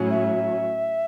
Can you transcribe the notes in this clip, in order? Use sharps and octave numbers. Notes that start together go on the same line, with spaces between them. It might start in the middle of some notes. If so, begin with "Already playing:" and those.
Already playing: A2 F#3 C#4
E5